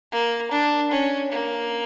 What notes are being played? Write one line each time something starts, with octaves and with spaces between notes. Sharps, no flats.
A#3
D4
C#4
A#3